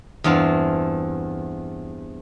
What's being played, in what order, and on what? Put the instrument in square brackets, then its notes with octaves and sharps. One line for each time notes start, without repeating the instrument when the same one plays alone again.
[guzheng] E2 G2 C4 F4 A5